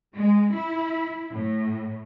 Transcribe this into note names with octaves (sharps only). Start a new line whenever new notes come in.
G#3
E4
A2